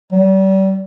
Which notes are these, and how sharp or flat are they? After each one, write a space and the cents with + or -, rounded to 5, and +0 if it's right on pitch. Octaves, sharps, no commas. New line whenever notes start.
G3 -35